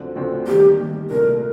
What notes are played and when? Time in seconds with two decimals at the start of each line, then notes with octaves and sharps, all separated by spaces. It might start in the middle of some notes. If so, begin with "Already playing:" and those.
Already playing: D2 D3 F3 C4
0.16 D2 D3 F3 C4
0.46 D#3 G3 A#3 G4
0.78 D#3 G3 A#3
1.10 C2 A#2 A3 A#4